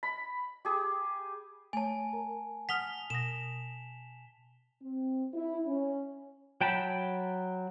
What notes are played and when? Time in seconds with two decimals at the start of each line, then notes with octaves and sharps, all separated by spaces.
0.03 B5
0.65 G4 G#4
1.73 A3 C#5 G#5 A5
2.13 A#4 A#5
2.69 F#5 D#6 F6 B6 F7 G7
3.10 B2 D#6 A#6 E7
4.82 C4
5.35 E4
5.66 C#4
6.61 F#3 G5 A5 B5